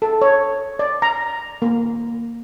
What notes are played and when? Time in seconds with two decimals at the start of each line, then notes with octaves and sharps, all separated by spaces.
0.02 A4
0.22 C#5
0.79 D5
1.02 A#5
1.62 A#3